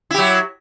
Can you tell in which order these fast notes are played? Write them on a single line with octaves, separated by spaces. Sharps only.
E4 G4 F#3